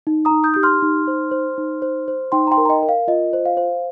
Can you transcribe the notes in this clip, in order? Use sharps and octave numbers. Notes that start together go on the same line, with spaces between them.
D#4
A#5 D#6
D#4
D#6 G6
G4 G6
C6 F6
D#4
C5
C5
D#4
C5
C5
D#4 G5 C6
A#5
G5 C6
A#4
A#5
D#5 G5
A#4
F5
F4 D#5
C5
F5
C5